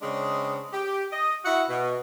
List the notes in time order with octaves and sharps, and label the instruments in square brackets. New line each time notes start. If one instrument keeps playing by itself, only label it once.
[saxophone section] C#3 G#3 C4 D4 G#4
G4
D#5
E4 F#4 F#5
B2